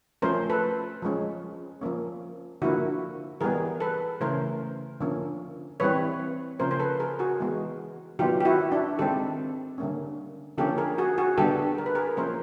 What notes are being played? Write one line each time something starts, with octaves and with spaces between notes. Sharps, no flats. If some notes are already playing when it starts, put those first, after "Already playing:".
F3 A3 C#4 A#4 C5
A4 B4
F3 G#3 C#4
F3 A#3 C#4
D3 F3 A#3 E4 F#4
E3 G3 B3 G#4 A#4
A4 B4
C#3 E3 A3 C#4 A#4 C5
D3 F3 A#3 C#4
E3 G3 C4 B4 C#5
C#3 F3 A#3 C#4 A#4 C5
C5
A4 B4
G#4 A#4
F#4 G#4
E3 G#3 B3
D#3 F#3 B3 F4 G4
G4
E4 F#4
D4 E4
D#3 G#3 C4 G4 A4
D3 G3 A#3 C#4
D3 F3 A#3 C#4 G4 A4
G#4 A#4
F#4 G#4
F#4 G#4
D3 G3 B3 G4 A4
A#4
B4
G#4 A#4
F3 A#3 C#4 A#4 C5